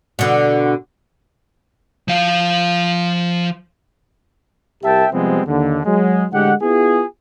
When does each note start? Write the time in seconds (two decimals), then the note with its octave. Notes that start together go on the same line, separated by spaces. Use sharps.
0.19 B2 D3
2.08 F3 F5
4.83 C2 G4 A#4 E5 G5 A5
5.13 C3 F3 G3 G#3 B3 C4
5.47 D#2 D3
5.85 F#3 G#3
6.32 A2 D3 G#3 G4 F#5
6.62 B3 E4 F4 G#4